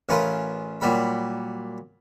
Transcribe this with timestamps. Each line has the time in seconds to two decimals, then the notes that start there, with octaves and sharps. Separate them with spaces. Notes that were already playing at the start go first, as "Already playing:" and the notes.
0.09 A1 C#4 F4 A#4 B4 C6
0.81 A#2 F#3 G3 B5